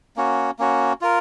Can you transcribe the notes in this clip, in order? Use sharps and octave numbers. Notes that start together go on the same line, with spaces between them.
A#3 C#4 F#4
A#3 C#4 F#4
F4 A#4